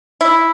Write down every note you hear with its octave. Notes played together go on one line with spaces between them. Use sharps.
E4